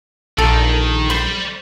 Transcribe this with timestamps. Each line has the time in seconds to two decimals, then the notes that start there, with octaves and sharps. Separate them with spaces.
0.38 A#1 D#3 A4
1.10 C5 D5 B5